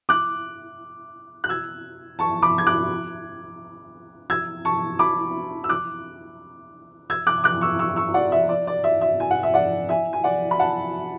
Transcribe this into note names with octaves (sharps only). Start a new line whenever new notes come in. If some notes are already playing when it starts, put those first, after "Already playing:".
D6 F#6
F#6
E6 G#6
A5 C#6
B5 D6
G#6
D6 F#6
E6 G#6
A5 C#6
B5 D6
E6
D6 F#6
E6 G#6
D6 F#6
D6 F#6
C#6 E6
C#6 E6
C#6 E6
D5 F#5
E5
D5
D5
E5
E5
G#5
F#5
E5
D5 F#5
E5 G#5
G#5
D5 F#5
B5
F#5 A5